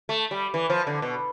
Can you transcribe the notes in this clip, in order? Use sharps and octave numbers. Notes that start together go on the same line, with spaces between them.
A3
G3
E3
F3
D3
B2